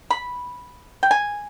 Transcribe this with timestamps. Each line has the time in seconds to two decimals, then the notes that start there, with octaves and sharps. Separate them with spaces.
0.10 B5
1.03 G5
1.11 G#5